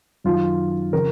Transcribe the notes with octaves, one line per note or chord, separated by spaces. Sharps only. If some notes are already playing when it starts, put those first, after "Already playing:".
F#2 D#3 F#3 F4
C#3 F3 A#4